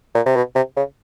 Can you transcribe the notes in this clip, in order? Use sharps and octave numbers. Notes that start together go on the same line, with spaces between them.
A#2
C3
B2
C3
C#3